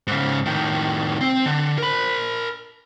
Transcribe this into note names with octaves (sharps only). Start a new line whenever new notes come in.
G#2 C#3
A2 D#3
C4
D3
A#4 B5